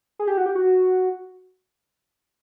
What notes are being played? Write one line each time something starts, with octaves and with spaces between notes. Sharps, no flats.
G#4
G4
F#4
G4
F#4